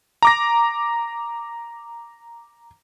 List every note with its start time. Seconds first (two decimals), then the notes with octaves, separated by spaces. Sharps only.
0.22 A#5 D6 A#6